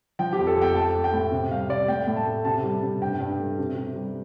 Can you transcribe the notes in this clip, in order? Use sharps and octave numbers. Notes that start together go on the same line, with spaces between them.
F3 G5
G4
F2
A4
F2 G5
A3 A5
A3
G5
A2
C3
G3 F5
C3 D5
A2 G5
A2
A5
A3
C3 A5
G3
C3
G2 G5
G2
A3
C3
C3
G3